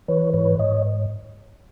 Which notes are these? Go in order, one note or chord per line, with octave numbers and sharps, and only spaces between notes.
E3 B4 C#5
G#2 B4 C#5
G#2 C#5 D#5